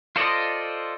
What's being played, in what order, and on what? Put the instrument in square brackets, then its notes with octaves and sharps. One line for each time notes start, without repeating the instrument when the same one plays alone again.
[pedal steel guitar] F4 A4 C5 D5 D#5